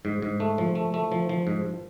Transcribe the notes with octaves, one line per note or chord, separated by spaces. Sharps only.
G#2
G#2
A3
F3
A3
A3
F3
F3
G#2